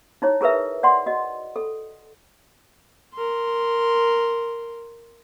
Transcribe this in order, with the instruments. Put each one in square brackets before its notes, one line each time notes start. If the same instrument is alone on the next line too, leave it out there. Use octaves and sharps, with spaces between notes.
[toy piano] D#4 E4 C#5
E4 G#4 A#4 B4 E5
D5 F#5 C6
F#4 D#5
A4
[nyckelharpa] A#4 C6